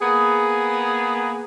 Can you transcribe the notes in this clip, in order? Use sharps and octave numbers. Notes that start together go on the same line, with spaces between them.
A#3 B3 G#4